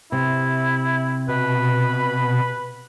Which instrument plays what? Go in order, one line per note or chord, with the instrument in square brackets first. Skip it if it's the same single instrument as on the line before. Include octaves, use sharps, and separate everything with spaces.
[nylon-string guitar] C3 [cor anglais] E4
[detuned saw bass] B2 [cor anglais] B4